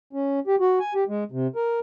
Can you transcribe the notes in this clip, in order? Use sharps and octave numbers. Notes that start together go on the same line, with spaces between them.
C#4
G4
F#4
G#5
G4
G#3
C3
A#4